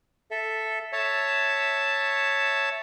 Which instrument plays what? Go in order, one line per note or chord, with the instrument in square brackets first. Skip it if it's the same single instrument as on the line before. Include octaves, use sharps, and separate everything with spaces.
[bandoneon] A4 E5
C#5 E5 A5